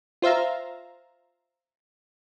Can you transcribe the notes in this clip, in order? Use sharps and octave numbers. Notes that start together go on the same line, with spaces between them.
F4 C5 E5 F5 A#5